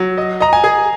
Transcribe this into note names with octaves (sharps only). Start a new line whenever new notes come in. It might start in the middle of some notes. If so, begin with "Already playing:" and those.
Already playing: F#3
D#5
D#5 A#5
G#5
G#4